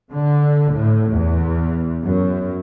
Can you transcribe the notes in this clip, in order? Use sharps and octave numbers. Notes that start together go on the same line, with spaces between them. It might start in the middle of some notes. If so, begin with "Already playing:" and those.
D3
A2
E2
F#2